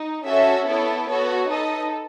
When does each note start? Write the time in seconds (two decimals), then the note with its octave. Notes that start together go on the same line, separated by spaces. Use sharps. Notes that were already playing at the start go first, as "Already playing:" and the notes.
Already playing: D#4
0.25 C#4 F#4 A4 C#5 E5
0.67 B3 E4 A4 C#5
1.07 B3 F#4 A4 C#5
1.48 D#4 A4 B4 D#5